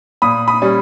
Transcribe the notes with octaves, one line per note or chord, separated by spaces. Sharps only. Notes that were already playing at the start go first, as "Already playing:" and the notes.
A#2 B5 D#6
B5 D#6
G3 C#4